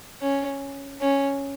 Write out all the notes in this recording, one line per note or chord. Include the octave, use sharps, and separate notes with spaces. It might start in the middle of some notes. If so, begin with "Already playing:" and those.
C#4
C#4